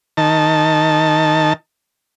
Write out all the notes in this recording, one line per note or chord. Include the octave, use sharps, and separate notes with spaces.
D#3 A5